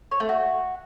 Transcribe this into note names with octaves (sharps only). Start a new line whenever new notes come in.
C#5
A3
F#4